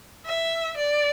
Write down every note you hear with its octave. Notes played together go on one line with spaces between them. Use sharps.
E5
D5